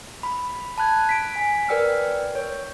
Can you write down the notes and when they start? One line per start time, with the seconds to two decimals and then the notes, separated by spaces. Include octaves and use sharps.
0.23 B5
0.78 A5 B5 F#6 G#6
1.09 B6 D7
1.36 G#5 B6
1.69 A#4 B4 D5 G5 E6 F6
2.35 C#5